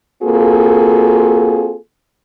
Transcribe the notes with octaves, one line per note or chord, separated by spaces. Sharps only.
A#3 C4 F4 F#4 G#4 A4